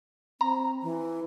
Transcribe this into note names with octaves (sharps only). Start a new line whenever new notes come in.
C4 A#5
E3